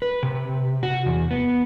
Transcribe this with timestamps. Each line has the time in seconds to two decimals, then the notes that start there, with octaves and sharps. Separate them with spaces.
0.02 B4
0.23 C3
0.83 F#4
1.06 E2
1.31 B3